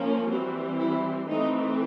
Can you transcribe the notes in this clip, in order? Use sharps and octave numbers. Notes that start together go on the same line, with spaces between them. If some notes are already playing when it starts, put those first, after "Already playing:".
Already playing: F3 A#3 C#4
E3 G3 C4 F#4
E4
E3 A3 C4 D#4